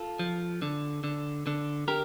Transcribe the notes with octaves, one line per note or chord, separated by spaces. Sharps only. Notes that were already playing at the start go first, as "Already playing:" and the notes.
Already playing: F4 A4
F3
D3
D3
D3
D3 G4 A#4